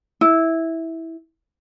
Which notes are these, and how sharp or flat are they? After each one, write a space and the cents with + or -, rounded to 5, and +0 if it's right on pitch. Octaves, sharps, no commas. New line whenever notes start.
E4 -10